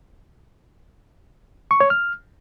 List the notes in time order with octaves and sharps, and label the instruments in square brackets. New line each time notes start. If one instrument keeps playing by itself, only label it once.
[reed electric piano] C#6
C#5
F6